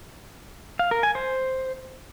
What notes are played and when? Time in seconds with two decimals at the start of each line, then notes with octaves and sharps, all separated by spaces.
0.79 F5
0.91 A#4
1.03 G#5
1.15 C5